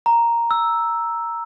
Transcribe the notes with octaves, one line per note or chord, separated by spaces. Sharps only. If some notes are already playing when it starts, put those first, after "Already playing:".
A#5
E6